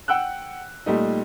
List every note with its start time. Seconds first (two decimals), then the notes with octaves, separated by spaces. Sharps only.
0.08 F#5 G5 E6 F#6
0.86 A#2 G3 A3 D#4